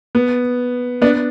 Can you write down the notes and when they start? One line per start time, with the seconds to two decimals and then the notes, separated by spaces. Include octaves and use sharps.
0.15 B3
1.02 B3 D4